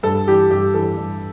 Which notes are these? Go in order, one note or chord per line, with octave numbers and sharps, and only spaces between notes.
G2 A4
E3 G3 G4
G2 G4
E3 G3 A4
G2